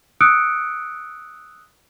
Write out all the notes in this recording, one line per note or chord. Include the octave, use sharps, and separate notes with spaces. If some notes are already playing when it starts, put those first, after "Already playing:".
D#6 E6 F#6 C#7 D7